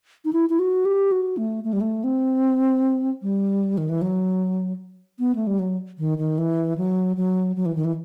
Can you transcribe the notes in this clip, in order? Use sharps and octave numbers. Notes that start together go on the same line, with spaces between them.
D#4
E4
E4
F#4
G4
F#4
A3
A3
G3
A3
C4
G3
D#3
E3
F#3
B3
A3
G3
F#3
D#3
D#3
E3
F#3
F#3
F#3
E3
D#3
E3